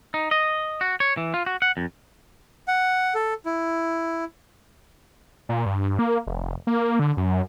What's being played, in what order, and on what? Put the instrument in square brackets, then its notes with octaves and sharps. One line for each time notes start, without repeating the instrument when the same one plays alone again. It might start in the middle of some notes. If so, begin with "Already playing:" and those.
[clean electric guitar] D#4
D#5
F#4
C#5
E3
F4
F#4
F#5
F2
[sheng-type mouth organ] F#5
A4
E4
[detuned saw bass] A#2
G2
A#3
F1
A#3
D3
F#2